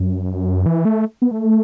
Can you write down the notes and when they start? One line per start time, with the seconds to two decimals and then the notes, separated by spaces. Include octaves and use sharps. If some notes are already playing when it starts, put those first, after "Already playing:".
Already playing: F#2
0.66 E3
0.85 A3
1.22 B3
1.31 A3